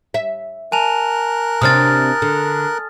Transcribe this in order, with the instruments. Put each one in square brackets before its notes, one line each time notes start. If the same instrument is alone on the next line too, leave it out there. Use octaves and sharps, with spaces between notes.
[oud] E5
[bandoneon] A#4 F#6 [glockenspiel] G#5 A5 F7
[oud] C3 C4 D4 [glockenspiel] D#6 F6 A6
[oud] D3